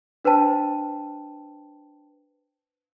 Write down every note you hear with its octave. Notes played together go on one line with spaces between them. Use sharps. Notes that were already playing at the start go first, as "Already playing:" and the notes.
D4 B4 C5 G5 A5